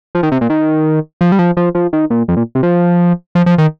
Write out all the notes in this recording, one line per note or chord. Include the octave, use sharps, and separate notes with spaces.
F3
D#3
C3
A#2
D#3
F3
G3
F3
F3
F3
D#3
A#2
F2
A#2
C3
F3
F3
F3
D#3